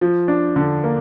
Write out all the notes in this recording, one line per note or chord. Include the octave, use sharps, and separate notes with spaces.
F3
D4
D3
A#3